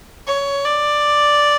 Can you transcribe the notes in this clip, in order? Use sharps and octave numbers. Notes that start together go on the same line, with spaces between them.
C#5
D5